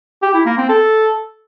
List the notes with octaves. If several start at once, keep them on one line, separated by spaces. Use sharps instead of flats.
G4
E4
A#3
C4
A4